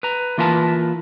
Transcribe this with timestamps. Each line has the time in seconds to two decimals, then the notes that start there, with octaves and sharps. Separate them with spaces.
0.03 B4 A#5
0.38 E3 A#3 F4 A#4 B4 A5